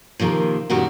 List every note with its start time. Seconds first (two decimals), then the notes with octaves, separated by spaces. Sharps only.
0.20 C3 D#3 F3 A#3
0.70 F#2 A#2 D#3 G3 F#4